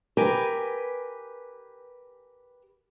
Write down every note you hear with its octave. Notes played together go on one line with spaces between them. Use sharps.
G4 A#4 B4 G#5